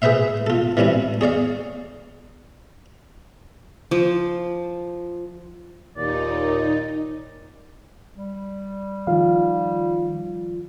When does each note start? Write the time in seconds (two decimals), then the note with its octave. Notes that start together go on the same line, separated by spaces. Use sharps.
0.02 G#4 B4 C5 E5 F5
0.47 F4 A4
0.77 E3 G3 C4 C#4 E4
1.21 G#4 C#5 D5 F5
3.91 F3
5.97 D#2 A#2 D#4 D5
8.15 G3
9.07 D#3 F3 F4 F5